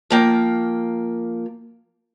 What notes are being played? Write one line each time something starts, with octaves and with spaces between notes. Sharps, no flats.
F3 A#3 G5